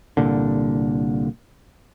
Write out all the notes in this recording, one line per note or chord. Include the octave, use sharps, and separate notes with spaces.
C2 A#2 D3